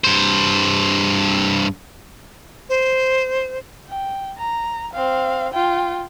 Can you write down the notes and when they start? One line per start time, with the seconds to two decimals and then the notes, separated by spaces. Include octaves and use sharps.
0.04 G2 C5
2.69 C5
3.89 G5
4.37 A#5
4.94 C4 F5
5.53 F4 G5